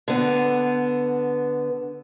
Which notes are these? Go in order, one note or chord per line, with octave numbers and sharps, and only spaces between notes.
D3 B3